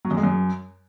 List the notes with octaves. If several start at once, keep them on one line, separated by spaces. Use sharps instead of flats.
F#3
F#2
G#3
F#2